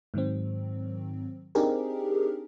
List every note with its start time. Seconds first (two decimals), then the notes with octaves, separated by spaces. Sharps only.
0.14 G#2 D#3 F#3 C4
1.55 C4 D4 D#4 G4 G#4 A#4